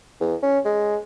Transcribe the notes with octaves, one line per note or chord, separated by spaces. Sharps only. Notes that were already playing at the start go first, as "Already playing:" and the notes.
E2
C#4
G#3